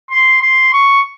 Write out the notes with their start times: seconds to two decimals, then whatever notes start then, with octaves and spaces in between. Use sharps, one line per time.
0.11 C6
0.42 C6
0.73 C#6